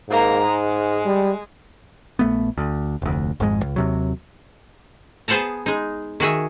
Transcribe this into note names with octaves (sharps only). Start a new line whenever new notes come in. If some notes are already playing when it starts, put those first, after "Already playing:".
G#2 A#3 A#5
G#3
G3
A#1 A3 B3
D2
F1 D2
G#1 F2 G#2 G#3
C#2
D#2 C3 F#3
B3 G#4 C5 F#5 A5 A#5
G#3 D#4
D#3 F#4 G#4 E5